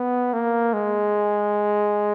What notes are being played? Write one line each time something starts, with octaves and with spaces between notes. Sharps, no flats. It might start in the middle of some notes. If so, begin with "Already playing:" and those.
Already playing: B3
A#3
G#3